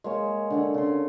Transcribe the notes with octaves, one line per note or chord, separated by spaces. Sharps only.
G#3 A#3 C#5
D3 D4 A4
C#3 A4 C6